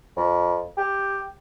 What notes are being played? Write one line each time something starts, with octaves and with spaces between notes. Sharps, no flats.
F2
G4